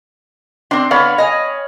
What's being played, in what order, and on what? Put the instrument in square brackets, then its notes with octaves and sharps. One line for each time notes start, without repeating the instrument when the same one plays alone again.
[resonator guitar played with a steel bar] C4 D4 [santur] C6
[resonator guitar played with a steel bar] D3 B3 D5 [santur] C#5 F5 B5
[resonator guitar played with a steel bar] D#5 G#5